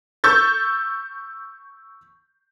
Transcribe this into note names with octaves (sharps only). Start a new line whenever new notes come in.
C#6 E6 G6 A6